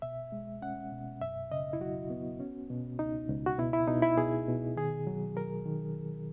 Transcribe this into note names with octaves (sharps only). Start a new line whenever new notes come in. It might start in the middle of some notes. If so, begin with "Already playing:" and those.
B2 E5
G#3
C#4 F#5
B2
F#2 E5
C#3 D#5
E4
F#3 F#4
B3
C#4
B2
C#2 D#4
C#2
F#4
B2 E4
E4
B2 D#4
E4
B2 G#4
B2
D#3 G#4
F#3
F#3 A#4
D#3